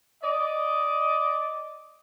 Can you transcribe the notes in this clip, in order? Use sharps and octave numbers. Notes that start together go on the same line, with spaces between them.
D5 D#5